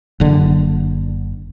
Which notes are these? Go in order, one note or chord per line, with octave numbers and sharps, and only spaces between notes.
F#1 D3